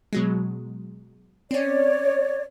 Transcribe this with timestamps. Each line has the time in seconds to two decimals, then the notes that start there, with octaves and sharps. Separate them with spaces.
0.13 B2 F#3 G#3
1.51 C4 C#4 C#5 D5